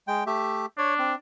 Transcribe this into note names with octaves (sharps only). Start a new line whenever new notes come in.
G#3 G5
A3 G4 E5
D4 C#5
C4